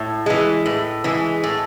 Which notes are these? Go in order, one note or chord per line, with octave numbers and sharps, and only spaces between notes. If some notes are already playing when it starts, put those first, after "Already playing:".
Already playing: A2
E3 G#3
A2
E3 G#3
A2